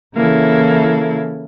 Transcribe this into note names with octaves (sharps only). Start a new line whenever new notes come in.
C#3 E3 A#3 E4 A4